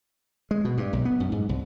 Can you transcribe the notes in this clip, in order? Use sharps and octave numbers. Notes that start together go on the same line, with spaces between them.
G#3
B2
G2
B1
B3
F#2
G#2
C2